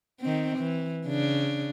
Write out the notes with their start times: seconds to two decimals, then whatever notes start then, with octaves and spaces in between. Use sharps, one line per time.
0.21 D#3 C4
0.58 E3
1.05 C#3 D4